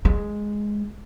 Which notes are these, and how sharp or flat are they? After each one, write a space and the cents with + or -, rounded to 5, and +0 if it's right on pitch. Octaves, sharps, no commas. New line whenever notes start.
G#3 +0